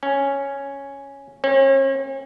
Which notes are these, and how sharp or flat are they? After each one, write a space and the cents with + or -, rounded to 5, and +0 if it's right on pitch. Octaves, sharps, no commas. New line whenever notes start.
C#4 +0
C#4 -40